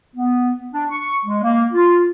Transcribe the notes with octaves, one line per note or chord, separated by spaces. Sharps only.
B3
D4
C#6
G#3
A#3
F4